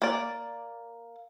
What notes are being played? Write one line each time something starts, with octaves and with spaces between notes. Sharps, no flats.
A#3 D5